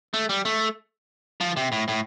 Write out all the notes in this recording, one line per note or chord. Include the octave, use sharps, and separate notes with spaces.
A3
G3
A3
F3
C3
A2
A2